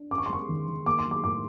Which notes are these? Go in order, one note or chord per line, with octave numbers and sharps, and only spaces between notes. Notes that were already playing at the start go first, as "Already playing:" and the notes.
Already playing: D4
C#4 D6
C#6
C6
G#3 C#6
D#3
D#3
A#3 D6
C6
F#3
D6
A2 D6